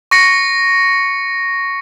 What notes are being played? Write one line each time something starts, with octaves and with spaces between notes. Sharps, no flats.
C#6 A#6 C#7